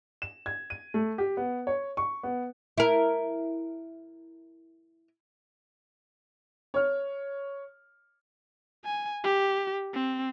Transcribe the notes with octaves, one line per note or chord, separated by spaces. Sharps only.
E7
G#6
D#7
A3
G4
B3
C#5
C#6
B3
E4 A#4
C#5 F6
G#5
G4
C4